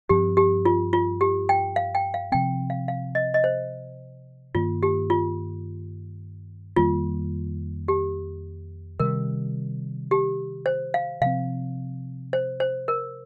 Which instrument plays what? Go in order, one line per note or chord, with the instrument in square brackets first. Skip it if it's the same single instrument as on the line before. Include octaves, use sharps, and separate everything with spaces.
[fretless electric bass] G2 F3 C4 [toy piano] G4
[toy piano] G4
F4
F4
G4
G5
F5
G5
F5
[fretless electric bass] C3 F3 C4 [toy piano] G5
[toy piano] F5
F5
D#5
D#5
C5
[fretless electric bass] G2 D#3 A#3 [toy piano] F4
[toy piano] G4
F4
[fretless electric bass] F2 D#3 G3 A#3 [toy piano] F4
[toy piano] G4
[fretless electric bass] C3 D#3 G3 [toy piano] A#4
[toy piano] G4
C5
F5
[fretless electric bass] C3 F3 C4 [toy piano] F5
[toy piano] C5
C5
A#4